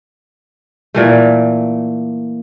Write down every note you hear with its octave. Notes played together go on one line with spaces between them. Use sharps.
A#2 E3 A3